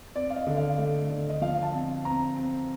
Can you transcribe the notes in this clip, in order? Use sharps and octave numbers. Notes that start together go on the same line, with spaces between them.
C4 D5
F5
D#5
D3
F5
A3
D3
D#5
F3 F5
A5
C4
C4 A#5
C4